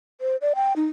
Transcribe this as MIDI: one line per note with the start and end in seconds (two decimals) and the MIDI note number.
0.21 0.36 72
0.41 0.53 74
0.55 0.73 79
0.76 0.85 63